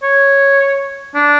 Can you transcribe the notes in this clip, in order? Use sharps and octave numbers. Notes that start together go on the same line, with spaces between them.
C#5
D4